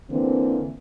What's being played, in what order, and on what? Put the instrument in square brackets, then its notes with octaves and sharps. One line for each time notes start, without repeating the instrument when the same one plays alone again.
[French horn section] D3 E3 A#3 C4